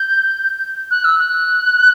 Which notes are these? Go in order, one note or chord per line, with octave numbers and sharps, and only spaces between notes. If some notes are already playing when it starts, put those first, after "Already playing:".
Already playing: G6
F#6
E6
F#6